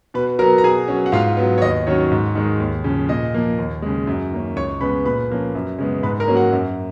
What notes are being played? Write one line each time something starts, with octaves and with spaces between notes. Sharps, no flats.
B2 B4 B5
F#3 B3 A#4 A#5
A#5
B2 G#4 G#5
F#3 C#4
F#5
G#2 F4 F5
F#3 B3
C#5
D#2 D#5
D#3 F#3 C#4 C#5
G#2
D#3 G#3
D#2
C#3 F3
A#2 D#5
F3 A#3
D#2
C#3 G#3
F#2
D#3 A#3 C#4
C#2 C#5 C#6
C#3 G#3 B3 B4 B5
A#2 B4 B5
F3 A#3 C#4
F#2
C#3 G#3 B3
G#2 B4 B5
A#4 A#5
F#3 A#3 C#4
F#4 F#5
F#2